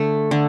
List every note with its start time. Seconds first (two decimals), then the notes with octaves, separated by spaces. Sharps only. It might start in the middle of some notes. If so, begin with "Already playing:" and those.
Already playing: D3 A3
0.31 D3